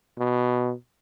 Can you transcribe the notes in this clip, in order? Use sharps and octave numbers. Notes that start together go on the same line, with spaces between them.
B2